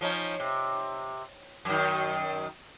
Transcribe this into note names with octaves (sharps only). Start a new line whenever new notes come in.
F3 C#4 D#4
C3
F#2 D#3